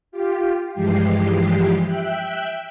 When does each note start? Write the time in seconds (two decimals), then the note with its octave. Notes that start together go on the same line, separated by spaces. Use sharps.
0.12 F4 G4
0.73 G2 E3 F3 G#3 G4 C7
1.85 E5 G5 F#6